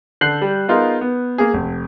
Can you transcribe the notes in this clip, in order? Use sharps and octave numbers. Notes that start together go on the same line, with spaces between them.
D3 A4 F#6 G6 C7 F#7
G3
B3 D#4 F4 G#4 A#4
B3
A#3 G#4
F1